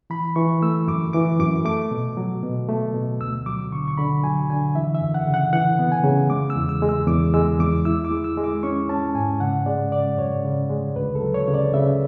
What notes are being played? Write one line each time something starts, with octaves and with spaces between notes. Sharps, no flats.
E3 B5
E3 C#6
A3 E6
F#2 D6
E3 D6
F#2 D6
A3 D6
B2
F#3
B2
A3
B2
D2 E6
F#3 D6
D3 C#6
C#6
D3 B5
F#3 G#5
D3 G#5
E3 E5
E5
F#2
F#5
C#3
F#5
E3 F#5
B3
G#5
C#3
G#3 D6
E6
E2
E6
G#3
E6
E2 D6
G#3 E6
E2 D6
E4 E6
D6
G#3
E6
G#3
D6
C#4 C#6
C#4 A5
G#2 G#5
C#3 F#5
G#3 D5
C#3 D5
F#2 C#5
C#3
G#3
D2 B4
A4
F#3
C#5
C#3
D5
C#3 E5